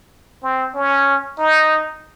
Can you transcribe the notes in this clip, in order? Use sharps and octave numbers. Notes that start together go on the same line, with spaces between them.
C4
C#4
D#4